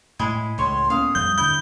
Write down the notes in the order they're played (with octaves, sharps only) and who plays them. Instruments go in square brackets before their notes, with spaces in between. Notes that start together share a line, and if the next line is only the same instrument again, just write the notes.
[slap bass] A2 [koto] G#3 E4 G#4
[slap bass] C#2 [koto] A2 C#5 [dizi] C6
[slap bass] A#3 B3 C#4 [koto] F5 [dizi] D#6
[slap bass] F2 G3 [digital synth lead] G6
[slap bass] D2 G2 D3 [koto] E4 [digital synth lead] G6